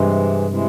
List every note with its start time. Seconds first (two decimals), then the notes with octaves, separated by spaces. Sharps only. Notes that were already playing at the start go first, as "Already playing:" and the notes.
Already playing: G2 C3 E3 G#3
0.49 C3 E3 G#3